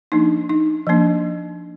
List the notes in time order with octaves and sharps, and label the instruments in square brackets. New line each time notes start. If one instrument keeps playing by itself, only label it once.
[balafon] F3 A#3 D4 D#4
D#4
F3 A#3 D4